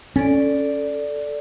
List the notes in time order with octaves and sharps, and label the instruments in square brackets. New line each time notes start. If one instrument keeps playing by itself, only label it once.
[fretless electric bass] C#4 [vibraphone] A4 D5